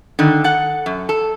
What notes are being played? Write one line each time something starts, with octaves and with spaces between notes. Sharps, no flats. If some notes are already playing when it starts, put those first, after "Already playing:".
D3 D#3
A4 F#5
F#2
A4